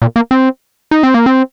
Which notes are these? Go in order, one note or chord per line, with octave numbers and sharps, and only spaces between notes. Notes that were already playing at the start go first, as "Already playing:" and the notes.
A#2
A#3
C4
D#4
C4
A#3
C4